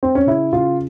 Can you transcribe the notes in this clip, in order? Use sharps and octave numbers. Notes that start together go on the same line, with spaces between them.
C4
C#4
C#3 E4
C#3 F4